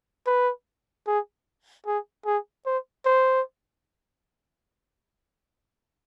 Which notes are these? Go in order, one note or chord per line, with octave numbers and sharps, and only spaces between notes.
B4
G#4
G#4
G#4
C5
C5